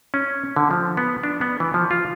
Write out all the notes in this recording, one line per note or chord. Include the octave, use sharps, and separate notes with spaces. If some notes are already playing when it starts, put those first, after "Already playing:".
C#4
D3
F3
B3
D4
B3
E3
F3
F4